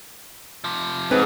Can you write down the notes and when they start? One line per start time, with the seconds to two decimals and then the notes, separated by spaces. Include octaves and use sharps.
0.64 C3 F3
1.11 G#2 C4 B4